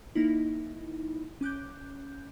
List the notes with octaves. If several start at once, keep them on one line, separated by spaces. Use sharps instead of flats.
A#3 D#4 E4
C#4 D6 F#6 G6